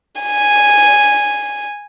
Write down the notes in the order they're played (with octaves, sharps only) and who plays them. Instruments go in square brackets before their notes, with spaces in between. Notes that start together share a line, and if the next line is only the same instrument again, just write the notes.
[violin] G#5